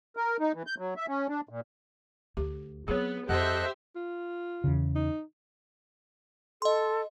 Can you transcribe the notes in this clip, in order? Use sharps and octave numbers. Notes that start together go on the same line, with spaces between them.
A#4
D#4
E3
G6
F#3
E5
C#4
D4
A#2
D2 G4
F#3 B3 C4 G#4 C#5
F2 G4 A4 C5 D#5 E5 F#5 F#6
F4
E2 C#3
D#4
A4 D#5 C6